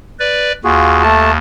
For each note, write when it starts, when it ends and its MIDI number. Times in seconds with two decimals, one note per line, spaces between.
0.19 0.52 71
0.19 0.52 74
0.64 1.38 39
0.64 1.03 65
0.64 1.03 66
0.64 1.03 68
1.03 1.31 57
1.03 1.31 81